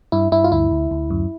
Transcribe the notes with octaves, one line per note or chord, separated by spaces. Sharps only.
G2 E4
G2 E4
F4
D2 E4
D2
D2
F#2